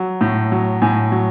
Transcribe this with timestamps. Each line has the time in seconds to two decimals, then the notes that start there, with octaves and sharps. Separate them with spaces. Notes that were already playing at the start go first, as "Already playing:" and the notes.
Already playing: F#3
0.21 A2
0.52 F#3
0.82 A2 G#5
1.12 F#3